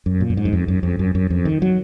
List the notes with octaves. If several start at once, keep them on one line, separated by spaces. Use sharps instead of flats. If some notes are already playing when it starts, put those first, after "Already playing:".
F#2
A#2
F#2
G#2
F#2
F2
F#2
F2
F#2
F#2
F2
D#3
F#3